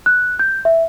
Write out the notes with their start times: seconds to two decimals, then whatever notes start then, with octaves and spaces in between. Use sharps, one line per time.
0.06 F#6
0.39 G6
0.65 E5